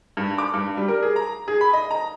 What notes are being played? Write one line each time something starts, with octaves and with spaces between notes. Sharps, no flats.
G2
D6
G2
G3
A#4
G#4
A#5
G#4
B5
D#5
A#5